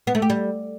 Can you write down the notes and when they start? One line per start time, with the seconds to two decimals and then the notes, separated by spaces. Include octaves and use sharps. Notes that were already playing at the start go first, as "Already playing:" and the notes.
0.07 B3
0.15 A3
0.22 G4
0.30 G3